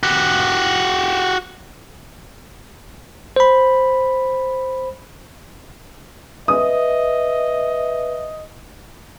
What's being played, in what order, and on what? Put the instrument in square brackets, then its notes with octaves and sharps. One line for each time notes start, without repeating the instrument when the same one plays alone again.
[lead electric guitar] F#4 G4
[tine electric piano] C5 B5
[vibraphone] B4 [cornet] D#5 [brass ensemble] E5 [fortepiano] D#6